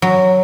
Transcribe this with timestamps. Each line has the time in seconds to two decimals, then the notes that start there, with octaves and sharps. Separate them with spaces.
0.02 F#3